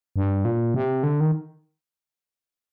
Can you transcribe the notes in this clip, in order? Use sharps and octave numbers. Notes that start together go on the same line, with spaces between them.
G2
A#2
C3
D3
D#3